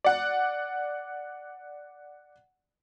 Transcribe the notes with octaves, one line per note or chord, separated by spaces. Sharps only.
D5 F#5